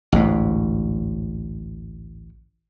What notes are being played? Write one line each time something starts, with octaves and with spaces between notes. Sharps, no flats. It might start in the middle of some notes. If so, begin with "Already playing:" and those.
A1 D2 G#2